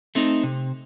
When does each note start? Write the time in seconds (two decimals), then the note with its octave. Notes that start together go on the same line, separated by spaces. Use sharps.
0.15 A3 C4 D#4
0.43 C3